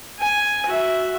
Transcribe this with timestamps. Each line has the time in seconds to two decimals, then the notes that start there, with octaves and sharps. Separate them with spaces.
0.20 G#5
0.66 F#4 E5